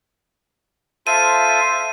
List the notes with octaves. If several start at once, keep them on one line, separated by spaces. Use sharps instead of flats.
F4 A4 C5 E5 D#7